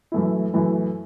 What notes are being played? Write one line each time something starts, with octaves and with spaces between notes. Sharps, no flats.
F#2 E3 A3 E4
F#2 E3 A3 E4